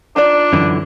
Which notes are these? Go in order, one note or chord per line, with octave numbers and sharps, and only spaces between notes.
D4 D#4 F4 D5
F#2 D3 E3